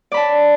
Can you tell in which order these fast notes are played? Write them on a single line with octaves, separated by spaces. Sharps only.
D5 B5 A5